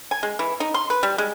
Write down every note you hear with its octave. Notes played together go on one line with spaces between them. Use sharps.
G#5
G#3
E3
D#4
C6
B4
G3
G#3